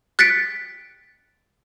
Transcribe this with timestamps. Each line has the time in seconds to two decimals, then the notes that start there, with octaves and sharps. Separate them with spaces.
0.19 F#6 A6 B6 C#7 D7